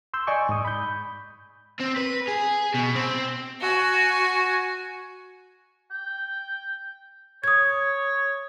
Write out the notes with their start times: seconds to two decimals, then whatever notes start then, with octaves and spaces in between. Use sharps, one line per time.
0.14 C6 E6 G6
0.27 D5 D#5 G#5 C#6 D6
0.49 G#2 D#6
0.65 B5 G6
1.80 C4
1.98 B4
2.29 G#4
2.75 B2
2.96 C4
3.60 F#4 G#5
5.91 G5
7.44 C#5 D#6 G#6